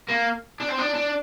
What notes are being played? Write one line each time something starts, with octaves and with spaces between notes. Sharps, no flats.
A#3
D4
C4
D4
D4